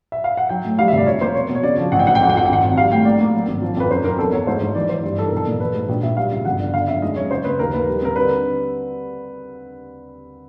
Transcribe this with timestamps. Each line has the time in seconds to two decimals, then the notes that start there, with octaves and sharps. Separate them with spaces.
0.12 E5
0.24 F5
0.37 F#5
0.49 F#3 G5
0.65 A2
0.79 G3 F5
0.88 F1 E5
0.98 D5
1.06 F3 C#5
1.21 A#3 C5
1.35 B2 C#5
1.50 B2
1.55 C#5
1.63 C#3 D5
1.78 F3
1.92 A1 F#5
1.99 G5
2.07 G#2 F#5
2.15 G5
2.20 F2 F#5
2.30 G5
2.35 F3 F#5
2.46 G5
2.49 G#1 F#5
2.63 G#1
2.77 G3 F5
2.91 A2 G5
3.05 A#3 D5
3.20 A#3
3.34 F#3
3.47 G#1
3.62 F3
3.77 F2 B4
3.91 F#2 C5
4.04 F#2 A#4
4.18 E2 A4
4.32 E2 C#5
4.47 G#2 C5
4.62 G#2 C#5
4.75 E3 D5
4.89 E3 C5
5.04 G2
5.17 E3 A4
5.28 B1 A#4
5.37 A4
5.47 A#2
5.60 E3 B4
5.74 G#2
5.89 A#1
6.03 A#1 E5
6.17 G3 F5
6.32 C#2
6.45 G1 F#5
6.60 D3
6.73 D3 F5
6.88 F2 E5
7.02 G#3 D#5
7.16 F#2 C#5
7.30 C#3 C5
7.44 A#3 B4
7.59 D#2 A#4
7.74 D#2 B4
7.88 G3
8.02 C4 A#4
8.16 D3 B4